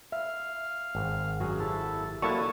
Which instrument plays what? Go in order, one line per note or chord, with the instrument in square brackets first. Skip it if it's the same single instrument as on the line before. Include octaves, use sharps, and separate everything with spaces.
[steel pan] E5 [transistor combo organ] F5
[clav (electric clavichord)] G#1
[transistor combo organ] F#2 [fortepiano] F#4 G#4
[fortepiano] C3 [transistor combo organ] E4 A4
[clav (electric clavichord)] F#3 A#3 E4 [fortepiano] A4 D5 A5 [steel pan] C#6 [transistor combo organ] D#6